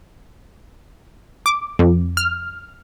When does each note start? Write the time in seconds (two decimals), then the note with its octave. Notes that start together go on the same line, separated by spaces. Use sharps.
1.46 D6
1.79 F2
2.17 F6